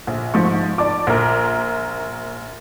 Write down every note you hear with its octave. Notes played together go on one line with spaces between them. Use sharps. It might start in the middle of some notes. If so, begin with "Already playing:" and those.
A#1
G#2 F3 C#6
D5 A5 D6
A#1 A#4